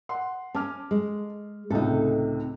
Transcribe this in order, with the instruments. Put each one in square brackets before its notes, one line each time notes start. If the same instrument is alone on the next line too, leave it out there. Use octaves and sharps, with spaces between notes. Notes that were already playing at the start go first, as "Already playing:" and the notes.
[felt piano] F#5 C6
[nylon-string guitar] C#4 [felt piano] A5 D6 F6
[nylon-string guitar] G#3
[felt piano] C#2 A2 C3 [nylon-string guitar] D#4 A4